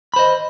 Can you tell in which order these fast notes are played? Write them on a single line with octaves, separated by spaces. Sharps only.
B5 C5 D#5